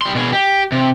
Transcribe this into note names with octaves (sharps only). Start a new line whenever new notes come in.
G3 C6
B2 G#4
G4
C3